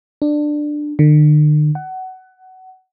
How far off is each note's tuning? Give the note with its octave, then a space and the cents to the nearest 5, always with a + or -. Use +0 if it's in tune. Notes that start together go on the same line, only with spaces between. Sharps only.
D4 +15
D3 +45
F#5 +20